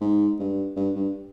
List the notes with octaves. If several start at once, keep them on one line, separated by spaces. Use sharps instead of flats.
G#2
G2
G2
G2